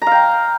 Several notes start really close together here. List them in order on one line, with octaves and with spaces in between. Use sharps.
A#5 F5 G5